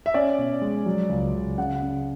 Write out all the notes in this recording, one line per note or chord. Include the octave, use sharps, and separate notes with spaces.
E5
C#4 D5
B2
G#3
F#3
C#2
C#2
C#3 F#5
C#3